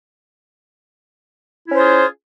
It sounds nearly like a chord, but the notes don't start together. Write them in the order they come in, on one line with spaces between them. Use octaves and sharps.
E4 C#4 C5 F4 G#4